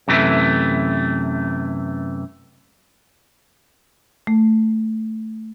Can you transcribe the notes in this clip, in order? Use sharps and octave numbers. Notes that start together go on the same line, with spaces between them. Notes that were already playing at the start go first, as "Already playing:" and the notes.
F#2 C3 E3 A3
A3